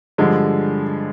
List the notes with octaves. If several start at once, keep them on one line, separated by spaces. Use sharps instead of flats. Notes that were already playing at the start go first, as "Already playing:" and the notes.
G2 D3 F3 G#3